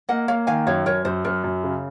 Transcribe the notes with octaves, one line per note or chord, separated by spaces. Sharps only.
A#3 D#5 F#5
A#3 C#5 F5
D#3 F5 G#5
F#2 C#5 F5
F#2 A#4 C#5
F#2 C5
F#2 A#4
F#2
C#3